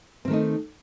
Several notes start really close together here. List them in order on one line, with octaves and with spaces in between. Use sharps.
C4 D#3 A3 D#4